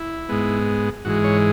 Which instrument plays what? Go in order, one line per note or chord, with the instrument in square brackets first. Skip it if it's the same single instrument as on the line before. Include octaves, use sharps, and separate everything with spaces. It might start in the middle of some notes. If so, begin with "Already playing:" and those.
Already playing: [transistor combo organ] E4
G#2 G#3 B3
G#2 E3 G#3 F#4
C#5